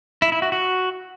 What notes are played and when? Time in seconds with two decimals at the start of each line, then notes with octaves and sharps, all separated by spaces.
0.22 E4
0.32 E4
0.42 F#4
0.52 F#4